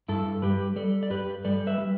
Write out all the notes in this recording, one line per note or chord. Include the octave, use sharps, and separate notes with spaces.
G2 E4 A4
G3 G4 B4
G3 A4 D5
D5
G2 G4 B4
G3 A4 D5
B4 E5
G3